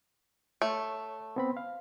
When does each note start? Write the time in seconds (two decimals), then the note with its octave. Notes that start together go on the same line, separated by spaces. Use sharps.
0.62 A3 C#5
1.36 B3 C4 B5
1.57 F5